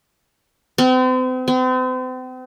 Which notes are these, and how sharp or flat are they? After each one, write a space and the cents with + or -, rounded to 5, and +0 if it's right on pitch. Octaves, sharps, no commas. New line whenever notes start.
C4 -40
C4 -40